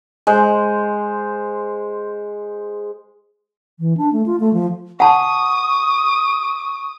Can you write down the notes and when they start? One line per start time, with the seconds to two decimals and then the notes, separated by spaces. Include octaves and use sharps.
0.27 G#3 C5
3.80 E3
3.97 D4
4.13 A3
4.26 F4
4.40 A3
4.53 F3
5.00 F#5 A5 C#6 D#6